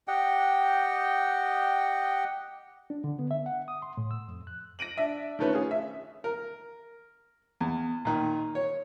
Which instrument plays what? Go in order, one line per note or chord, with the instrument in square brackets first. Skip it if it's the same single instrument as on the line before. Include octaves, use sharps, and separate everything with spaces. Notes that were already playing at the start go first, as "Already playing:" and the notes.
[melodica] G4 D#5 F#5 G5
[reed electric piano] D4
D3
B3
E5
F#5
D#6
C6
A2
E6
F2
F#6
[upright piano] A#6 D7 D#7 F#7
D4 E5
D#3 F3 A3 C#4 B4
C#4 F4 G#4
E5
[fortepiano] A#4
E2
A#2 D#3
C#5